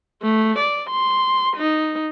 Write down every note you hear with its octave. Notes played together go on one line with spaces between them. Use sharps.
A3
D5
C6
D#4